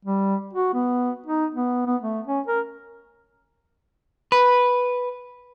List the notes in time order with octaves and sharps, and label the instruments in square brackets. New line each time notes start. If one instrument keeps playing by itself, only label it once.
[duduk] G3
F#4
B3
D#4
B3
B3
A3
C#4
A#4
[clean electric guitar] B4